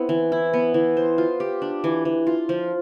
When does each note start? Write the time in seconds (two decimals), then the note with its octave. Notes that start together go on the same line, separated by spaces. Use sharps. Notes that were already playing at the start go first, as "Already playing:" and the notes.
Already playing: B3 C4 E4
0.09 E3
0.32 E4
0.53 B3
0.74 E3
0.97 C5
1.18 F4
1.40 G4
1.62 D4
1.84 E3
2.05 E3
2.27 F4
2.49 F3